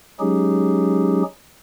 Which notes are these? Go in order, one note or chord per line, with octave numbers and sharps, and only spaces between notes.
F#3 G#3 C#4 D#4 G4 G#4